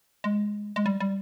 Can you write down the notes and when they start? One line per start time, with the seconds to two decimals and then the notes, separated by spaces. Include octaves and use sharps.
0.24 G#3
0.76 G#3
0.86 G3
1.00 G3